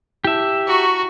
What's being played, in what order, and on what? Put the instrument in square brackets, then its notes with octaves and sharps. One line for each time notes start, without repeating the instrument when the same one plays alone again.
[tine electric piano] E4 A5 [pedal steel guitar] G4 E5
[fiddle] F#4 [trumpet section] A#5 C#6